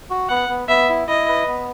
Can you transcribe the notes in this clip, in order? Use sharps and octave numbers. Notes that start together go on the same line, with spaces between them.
F#4
B3 F#5
B3
B3 E5
E4
E4 D#5
B4
B3